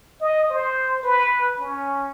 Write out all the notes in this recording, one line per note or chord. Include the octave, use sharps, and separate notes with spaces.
D#5
C5
B4
C#4